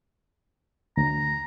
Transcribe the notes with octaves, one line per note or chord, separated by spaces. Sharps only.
D2 A#5